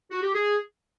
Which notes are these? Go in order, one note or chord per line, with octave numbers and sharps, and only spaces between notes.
F#4
G4
G#4